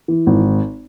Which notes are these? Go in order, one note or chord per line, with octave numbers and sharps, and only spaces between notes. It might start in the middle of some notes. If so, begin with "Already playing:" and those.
E3
G#1